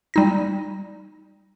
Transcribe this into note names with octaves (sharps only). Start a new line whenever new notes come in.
G3 D#4 A#6